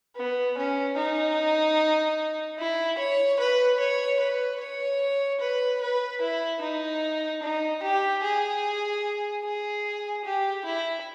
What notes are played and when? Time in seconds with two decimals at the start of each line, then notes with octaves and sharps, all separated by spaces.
0.16 B3
0.57 C#4
0.97 D#4
2.58 E4
2.98 C#5
3.39 B4
3.80 C#5
4.20 B4
4.60 C#5
5.40 B4
5.81 B4
6.21 E4
6.61 D#4
7.43 D#4
7.83 G4
8.23 G#4
9.44 G#4
10.25 G4
10.65 E4